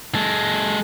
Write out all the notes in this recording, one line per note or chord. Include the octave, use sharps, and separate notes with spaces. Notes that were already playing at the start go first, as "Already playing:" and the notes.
G#3 A4